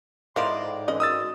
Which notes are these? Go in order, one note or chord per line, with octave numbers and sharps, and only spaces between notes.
G#2 D#3 F3 E4 A#4 D5 D#5 C6
A2
D3 E3 C#4 D#5
D#3 G#3 F#4 D#6 E6 A6